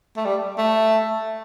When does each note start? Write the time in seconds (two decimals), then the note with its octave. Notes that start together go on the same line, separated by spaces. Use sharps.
0.17 A3
0.25 G3
0.58 A3